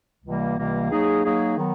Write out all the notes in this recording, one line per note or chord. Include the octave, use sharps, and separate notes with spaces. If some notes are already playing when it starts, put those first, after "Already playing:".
C#2 C3 E3 G3 A#3
C#2 C3 E3 G3 A#3
F#3 A#3 D#4 G#4
F#3 A#3 D#4 G#4
D#3 F#3 B3